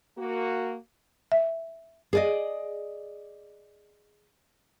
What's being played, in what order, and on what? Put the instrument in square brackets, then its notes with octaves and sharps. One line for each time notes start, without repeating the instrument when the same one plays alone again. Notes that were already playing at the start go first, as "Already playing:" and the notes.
[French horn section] A#3 F#4
[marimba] E5
[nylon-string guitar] G#4 D5 D#5